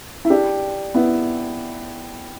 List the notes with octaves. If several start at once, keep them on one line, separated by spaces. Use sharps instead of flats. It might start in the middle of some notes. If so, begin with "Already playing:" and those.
E4
D4 G4
B3 E4